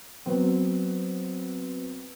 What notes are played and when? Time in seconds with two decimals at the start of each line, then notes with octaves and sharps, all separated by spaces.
0.26 F#3 B3 C4